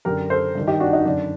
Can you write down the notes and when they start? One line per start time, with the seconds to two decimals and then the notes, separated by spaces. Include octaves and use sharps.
0.05 F#2 D3 G4 A#4
0.30 A4 C5
0.55 G2 D#3
0.67 D#4 G4
0.80 D4 F#4
0.93 D#4
1.05 F#2 D3 D4